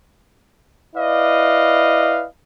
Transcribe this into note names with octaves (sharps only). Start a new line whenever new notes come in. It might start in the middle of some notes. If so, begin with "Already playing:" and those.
E4 B4 D5 D#5 F5